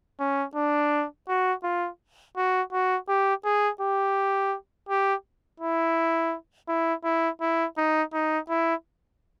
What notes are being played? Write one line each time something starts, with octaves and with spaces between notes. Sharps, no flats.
C#4
D4
F#4
F4
F#4
F#4
G4
G#4
G4
G4
E4
E4
E4
E4
D#4
D#4
E4